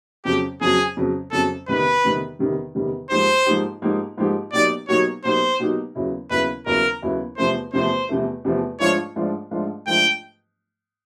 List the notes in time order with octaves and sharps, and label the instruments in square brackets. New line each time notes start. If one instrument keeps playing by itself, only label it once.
[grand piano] F2 C#3 F#3 [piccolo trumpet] G4
[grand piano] F2 C#3 F#3 [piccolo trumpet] G#4
[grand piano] F2 C#3 F#3
[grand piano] F2 C#3 F#3 [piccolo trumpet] A4
[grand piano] E2 C3 D#3 G3 [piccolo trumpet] B4
[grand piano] E2 C3 D#3 G3
E2 C3 D#3 G3
E2 C3 D#3 G3
[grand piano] G#2 F3 A#3 D#4 G4 [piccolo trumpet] C5
[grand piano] G#2 F3 A#3 D#4 G4
G#2 F3 A#3 D#4 G4
G#2 F3 A#3 D#4 G4
[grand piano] B2 F#3 A#3 D#4 G4 [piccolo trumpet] D5
[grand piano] B2 F#3 A#3 D#4 G4 [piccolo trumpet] C#5
[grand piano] B2 F#3 A#3 D#4 G4 [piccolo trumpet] C5
[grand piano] B2 F#3 A#3 D#4 G4
D#2 C#3 F#3 B3 E4
[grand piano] D#2 C#3 F#3 B3 E4 [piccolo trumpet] B4
[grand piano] D#2 C#3 F#3 B3 E4 [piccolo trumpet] A#4
[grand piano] D#2 C#3 F#3 B3 E4
[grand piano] E2 C3 F3 A3 [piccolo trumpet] C5
[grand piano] E2 C3 F3 A3 [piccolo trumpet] C5
[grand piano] E2 C3 F3 A3
E2 C3 F3 A3
[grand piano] G#2 F3 A3 D4 F4 [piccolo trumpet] C#5
[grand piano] G#2 F3 A3 D4 F4
G#2 F3 A3 D4 F4
[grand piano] G#2 F3 A3 D4 F4 [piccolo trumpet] G5